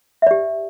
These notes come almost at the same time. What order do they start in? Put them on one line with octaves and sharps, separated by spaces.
E5 D5 G4